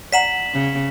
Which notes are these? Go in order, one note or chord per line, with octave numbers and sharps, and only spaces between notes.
D5 F#5 A#5 B6 E7 F#7
C#3